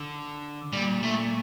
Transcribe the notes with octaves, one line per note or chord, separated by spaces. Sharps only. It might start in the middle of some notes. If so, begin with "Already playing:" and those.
Already playing: D3
A#2 G3
A3